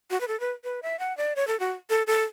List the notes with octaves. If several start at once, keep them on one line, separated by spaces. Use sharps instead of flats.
F#4
B4
A4
B4
B4
E5
F#5
D5
C#5
A4
F#4
A4
A4